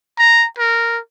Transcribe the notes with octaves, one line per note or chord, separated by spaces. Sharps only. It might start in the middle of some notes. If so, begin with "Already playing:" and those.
A#5
A#4